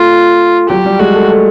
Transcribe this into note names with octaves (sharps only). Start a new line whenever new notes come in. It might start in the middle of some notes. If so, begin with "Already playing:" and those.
Already playing: A3 F4
F#3 G4
G3
G#3 F#4
A3
A3